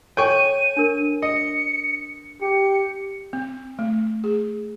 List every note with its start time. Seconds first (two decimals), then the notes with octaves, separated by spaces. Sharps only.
0.17 A4 C#5 G5 G#5 C#6 D#7
0.77 D4 A#4
1.22 D#5 C#7
2.42 G4 C#7
3.33 C4
3.79 A3
4.24 G#4